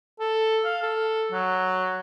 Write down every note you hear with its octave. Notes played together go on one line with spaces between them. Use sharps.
A4
F5
A4
F#3